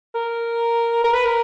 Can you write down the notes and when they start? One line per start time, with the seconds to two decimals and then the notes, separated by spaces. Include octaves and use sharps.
0.15 A#4
1.04 A#4
1.14 B4
1.25 A#4